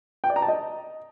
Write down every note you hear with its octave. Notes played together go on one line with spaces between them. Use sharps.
G5
D5
A#5
A5
D#5